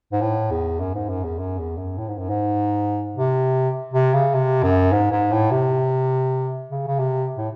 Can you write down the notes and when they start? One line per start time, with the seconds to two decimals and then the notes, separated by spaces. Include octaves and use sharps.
0.12 G#2
0.21 A2
0.51 E2
0.80 F#2
0.95 G#2
1.09 F#2
1.24 E2
1.39 F#2
1.59 E2
1.78 F#2
1.98 A2
2.08 G#2
2.18 F#2
2.29 G#2
3.16 C3
3.94 C3
4.14 C#3
4.34 C3
4.63 F#2
4.92 G#2
5.12 G#2
5.32 A2
5.51 C3
6.70 C#3
6.87 C#3
6.99 C3
7.37 A2